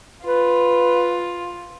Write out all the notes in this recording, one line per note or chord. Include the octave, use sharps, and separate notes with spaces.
F4 B4